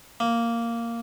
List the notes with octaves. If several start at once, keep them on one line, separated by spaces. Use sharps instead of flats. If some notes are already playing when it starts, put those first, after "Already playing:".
A#3